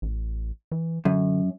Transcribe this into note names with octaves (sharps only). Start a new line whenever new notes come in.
A1
E3
F#2 D3